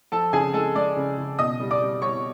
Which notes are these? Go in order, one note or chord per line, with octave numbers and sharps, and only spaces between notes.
F3 A4 A5
C#3 G#4 G#5
G#3 A4 A5
G#3 D5 D6
C#3
C#3
B2 D#5 D#6
G3
D5 D6
G3
G3 C#5 C#6